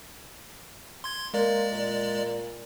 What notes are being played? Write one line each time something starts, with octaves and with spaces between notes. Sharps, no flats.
C6 G#6
G#3 A#3 D5
A#2